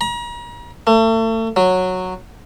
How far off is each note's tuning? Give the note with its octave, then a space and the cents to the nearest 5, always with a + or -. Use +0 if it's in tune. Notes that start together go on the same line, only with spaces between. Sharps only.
A#5 +40
A3 +35
F#3 -10